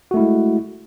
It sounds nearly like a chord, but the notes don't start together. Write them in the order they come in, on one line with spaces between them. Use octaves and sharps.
F#4 A3 E4 G#3